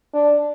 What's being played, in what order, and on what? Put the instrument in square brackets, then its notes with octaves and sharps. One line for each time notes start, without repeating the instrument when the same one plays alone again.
[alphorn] D4